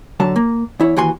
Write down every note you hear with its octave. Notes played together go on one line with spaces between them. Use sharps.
D3 F#3 A5
A#3
E2 E4 C#5
D#2 E3 F#4 G#5 C6